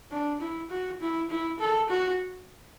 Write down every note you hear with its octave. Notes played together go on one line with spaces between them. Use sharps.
D4
E4
F#4
E4
E4
A4
F#4